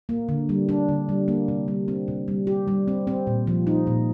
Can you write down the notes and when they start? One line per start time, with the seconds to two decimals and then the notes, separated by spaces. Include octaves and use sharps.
0.09 A#3
0.29 D3
0.49 G3
0.69 D4
0.89 D3
1.09 G3
1.28 A#3
1.48 C3
1.68 G3
1.88 C4
2.08 C3
2.28 G3
2.47 G4
2.68 G3
2.88 C4
3.07 C4
3.27 A#2
3.47 F3
3.67 D#4
3.87 A#2